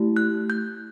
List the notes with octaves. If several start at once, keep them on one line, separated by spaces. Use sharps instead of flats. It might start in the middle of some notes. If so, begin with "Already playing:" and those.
Already playing: A3 E4 G4
F#6
G6